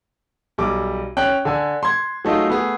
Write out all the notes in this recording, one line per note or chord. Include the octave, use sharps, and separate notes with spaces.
B1 G3 D6
C#4 G5 F#6
D3 G#5
C6 G#6
F#3 A3 D#4 F4 G#4
A3 B3 G#4